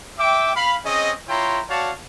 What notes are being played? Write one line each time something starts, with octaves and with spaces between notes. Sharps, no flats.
E5 G5 D6
F5 B5
C4 C#4 G#4 D#5
E4 F4 C#5 G5 A#5 C6
F#4 C#5 D5 F5 A5